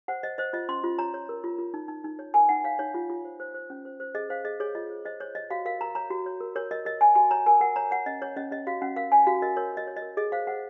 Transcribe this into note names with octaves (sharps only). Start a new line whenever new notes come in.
C5 F#5
C5 D#5
C5 D#5
F4 D#5
C#4 C6
F4
C#5 A#5
C#5
A#4
F4
F4
D#4
D#4
D#4
C#5
A#4 G#5
D#4 F#5
C#5 F5
D#4 C#5
F4
F4
C5
C5
C5
C#4
C5
C5
G#4 D#5
C5 F5
G#4 D#5
G#4 C#5
F4 D#5
C5
C5 D#5
C5 C#5
C#5 D#5
F#4 F5
A#4 F5
A#4 A#5
C#5 A#5
F#4
C#5
A#4
A#4 C#5
A#4 D#5
A#4 D#5
C#5 G#5
F#4 G#5
C#5 A#5
A#4 G#5
A#4 F#5
C#5 A#5
C#5 F#5
C#4 D#5
C#5
C#4 D#5
C#4 D#5
F#4 F5
C#4 F#5
A#4 F5
C#5 G#5
F#4 F5
A#4 D#5
A#4 C#5
A#4 D#5
C#5
D#5
A#4
G#4 D#5
C5 F5
C5 F#5